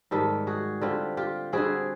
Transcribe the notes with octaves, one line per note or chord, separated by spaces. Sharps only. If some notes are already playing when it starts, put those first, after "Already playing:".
G#2 D#3 G3 G4 A4
F#4 G#4
D3 G3 C4 F4 G4
F4 G4
D3 G3 C4 F#4 G#4